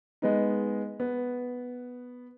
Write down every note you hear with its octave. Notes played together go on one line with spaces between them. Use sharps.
G#3 B3 D#4
B3